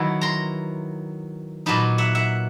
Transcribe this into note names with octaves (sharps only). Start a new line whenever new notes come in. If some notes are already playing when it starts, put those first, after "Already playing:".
Already playing: D#3 F#3 B3 E4
A#5 C6
A#2 F#3 B3 D#4 A5 B5
E5 F#5
E5 F#5